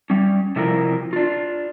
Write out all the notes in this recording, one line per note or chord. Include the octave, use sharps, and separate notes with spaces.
G3 C#4
C3 F3 E4 F4 A#4
D4 F4